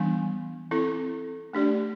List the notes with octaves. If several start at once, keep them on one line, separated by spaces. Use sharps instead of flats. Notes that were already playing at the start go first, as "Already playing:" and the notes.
Already playing: E3 G3 B3 D4
C4 E4 A4
A3 D4 G4 D5